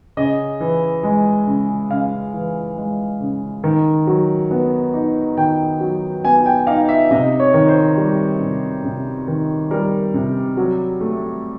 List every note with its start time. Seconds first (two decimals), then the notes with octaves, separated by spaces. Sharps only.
0.17 C#3 D#5
0.60 E3
1.03 G#3
1.47 C#3
1.90 C#3 F5
2.34 E3
2.77 G#3
3.21 C#3
3.64 D#3
4.07 F#3
4.51 B3
4.94 D#4
5.37 D#3 G5
5.81 F#3
6.24 B3 G#5
6.46 G5
6.67 D#4 F5
6.89 E5
7.11 C3 D#5
7.40 C#5
7.54 D#3
7.69 C5
7.97 G3
8.41 C3
8.84 C3
9.28 D#3
9.71 G3 A#4
10.14 C3
10.57 F#3
11.01 A3